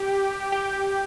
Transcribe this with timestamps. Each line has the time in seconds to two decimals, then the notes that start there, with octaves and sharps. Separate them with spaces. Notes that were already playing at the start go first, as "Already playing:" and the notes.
Already playing: G4
0.52 G4